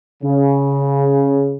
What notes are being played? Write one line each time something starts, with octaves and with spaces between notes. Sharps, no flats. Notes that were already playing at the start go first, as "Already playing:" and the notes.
C#3